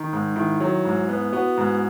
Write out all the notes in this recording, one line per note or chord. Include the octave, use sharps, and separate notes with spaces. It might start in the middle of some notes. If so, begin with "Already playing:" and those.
Already playing: D#3 D#4
G#2
D#3 E4
F#3
G#2
B3
B3 F#4
G#2